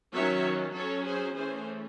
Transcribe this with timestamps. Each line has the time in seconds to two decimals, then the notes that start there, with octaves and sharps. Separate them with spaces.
0.14 D#3 F#3 C#4 C#5 E5
0.75 F#3 C#4 A4 C#5
1.06 G#4 C5
1.36 E3 A3 C#4 G#4 C5